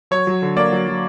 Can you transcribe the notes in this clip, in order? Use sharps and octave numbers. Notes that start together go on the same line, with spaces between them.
F#3 C#5
F#3
D3
A#3 D5
F#3
F#3